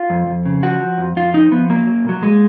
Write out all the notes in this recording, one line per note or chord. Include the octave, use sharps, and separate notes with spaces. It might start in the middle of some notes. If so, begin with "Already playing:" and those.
Already playing: F4
F2
F2
C#3
F3 F#4
F3
F2
F2 F4
F3 D#4
F3 B3
F#3 A#3
F#3
A#2 F#3
A#2 G#3